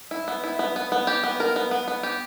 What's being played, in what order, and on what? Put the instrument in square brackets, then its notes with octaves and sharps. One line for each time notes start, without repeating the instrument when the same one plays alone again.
[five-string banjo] E4
B3
E4
B3
B3
B3
G4
B3
A#4
B3
B3
B3
G4